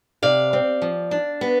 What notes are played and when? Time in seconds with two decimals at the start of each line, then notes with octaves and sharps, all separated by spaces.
0.23 C3 D5 F5
0.53 C4
0.82 F3
1.11 D4
1.41 B3